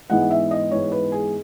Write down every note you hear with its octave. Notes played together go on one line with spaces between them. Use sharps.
G#2 E3 B3 F#5
E5
D#5
G#2 E3 B3 C#5
B4
G#4